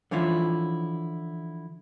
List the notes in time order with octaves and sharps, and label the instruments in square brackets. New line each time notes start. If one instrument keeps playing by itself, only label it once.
[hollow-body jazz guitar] D3 E3 F3 C#4 E4 F4